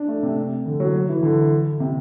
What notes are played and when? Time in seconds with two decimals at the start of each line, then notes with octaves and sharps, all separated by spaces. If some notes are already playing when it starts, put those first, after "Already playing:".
Already playing: D4
0.08 A3
0.23 C3
0.66 D3
0.80 F#3
1.09 E3
1.23 D3
1.80 C3